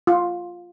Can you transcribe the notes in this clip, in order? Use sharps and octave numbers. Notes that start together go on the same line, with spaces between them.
F4